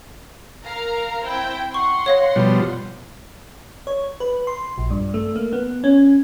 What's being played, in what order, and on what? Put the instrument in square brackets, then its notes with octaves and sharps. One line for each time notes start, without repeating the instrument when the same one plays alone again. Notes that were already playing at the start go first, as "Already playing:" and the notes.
[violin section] A#4 F5 A#5
C4 E4 G5
[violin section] F#5 C6 [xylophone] C#6
[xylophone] C#5 F5 A#6
[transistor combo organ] B2 F3 G3
[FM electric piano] C#5
B4
C6
A#1
G2
A3
A#3
B3
C#4